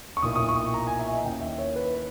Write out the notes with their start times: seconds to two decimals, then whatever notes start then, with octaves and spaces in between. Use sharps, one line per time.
0.17 C#6
0.22 B1 A#2 A#3 E4 D#6
0.36 D#6
0.49 C#6
0.74 A#5
0.87 G#5
0.99 E5
1.12 D#5
1.24 D#2 D#3 A#3 C#4 E4 G5
1.41 E5
1.58 C#5
1.76 B4